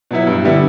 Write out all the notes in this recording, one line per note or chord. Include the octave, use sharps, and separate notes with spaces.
B2 F#3 B3 E4
G2
D3 G3 B3 E4